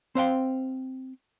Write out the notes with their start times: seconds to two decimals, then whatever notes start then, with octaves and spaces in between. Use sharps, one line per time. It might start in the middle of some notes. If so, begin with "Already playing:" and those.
0.15 C4 C5 F5 G5